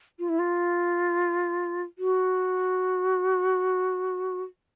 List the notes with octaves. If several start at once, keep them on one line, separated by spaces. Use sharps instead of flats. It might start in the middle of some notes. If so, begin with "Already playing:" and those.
F4
E4
F4
F#4